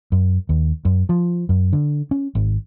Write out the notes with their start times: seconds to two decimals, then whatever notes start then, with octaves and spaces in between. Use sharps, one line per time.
0.12 F#2
0.49 D#2
0.85 F#2
1.09 F3
1.49 F#2
1.73 D3
2.11 C#4
2.35 G#1